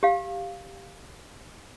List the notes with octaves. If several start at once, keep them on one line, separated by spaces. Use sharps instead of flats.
G4 F5